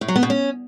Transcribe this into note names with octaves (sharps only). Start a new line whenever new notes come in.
A2
F#3
B3
B2
C#4